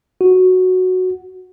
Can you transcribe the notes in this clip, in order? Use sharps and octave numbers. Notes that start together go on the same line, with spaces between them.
F#4